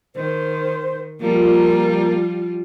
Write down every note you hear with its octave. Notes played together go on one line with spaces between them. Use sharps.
D#3 C5
F3 G3 A#3 F4